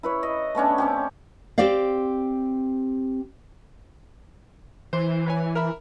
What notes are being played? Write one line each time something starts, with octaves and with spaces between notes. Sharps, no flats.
E4 B4 C#5
D#5
A3 B3 C#4 D4
C4 C#4 G4
C4 G4 C5 D5 F5
E3 C5
B4 C#5 G#5
A#4 E5 B5